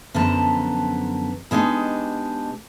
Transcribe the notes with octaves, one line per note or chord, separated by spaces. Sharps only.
F#2 D3 F3 B3 A5 A#5
B2 G#3 D4 D#4 G4